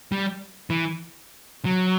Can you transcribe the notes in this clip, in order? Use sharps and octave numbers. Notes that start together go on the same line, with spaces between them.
G3
E3
F#3